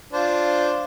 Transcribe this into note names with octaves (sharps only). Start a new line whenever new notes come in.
D4 F4 C5